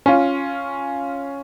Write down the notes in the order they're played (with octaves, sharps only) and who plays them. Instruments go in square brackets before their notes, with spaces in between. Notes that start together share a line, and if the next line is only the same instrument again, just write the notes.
[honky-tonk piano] C#4 F4